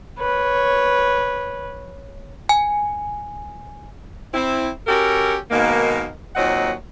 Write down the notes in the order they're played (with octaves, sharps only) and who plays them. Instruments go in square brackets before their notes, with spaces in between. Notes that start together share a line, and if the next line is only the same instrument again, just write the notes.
[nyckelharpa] B4 C#5
[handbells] G#5
[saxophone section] C4 E4
C#4 F#4 G4 A4 A#4
G#2 B2 D#3 A#3
D#2 A#2 F#3 C4 D#5 F#5